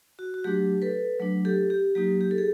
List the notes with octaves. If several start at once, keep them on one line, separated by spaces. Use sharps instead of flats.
F#4
F#4
F#3 A3 D4 G4
A4 B4
F#3 A3 D4
G4 A4
G4
F#3 A#3 D#4 G4
G4
A4
G#4